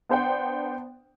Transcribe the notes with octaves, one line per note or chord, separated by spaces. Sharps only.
B3 D4 C5 F#5 G5